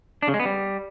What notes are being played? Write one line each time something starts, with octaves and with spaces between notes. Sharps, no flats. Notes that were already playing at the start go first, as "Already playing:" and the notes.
D4
C#3
G#3
B3
G3